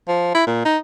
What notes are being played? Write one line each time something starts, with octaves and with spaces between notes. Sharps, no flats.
F3
E4
A#2
D#4